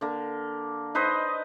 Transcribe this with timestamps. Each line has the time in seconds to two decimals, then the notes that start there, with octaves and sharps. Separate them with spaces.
0.01 D3 A#3
0.95 D#4 B4 C5 D#5